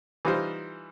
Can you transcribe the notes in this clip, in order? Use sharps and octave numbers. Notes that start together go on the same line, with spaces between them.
E3 G3 D#4 F4 C5